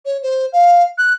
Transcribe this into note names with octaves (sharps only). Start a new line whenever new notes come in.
C#5
C5
F5
F#6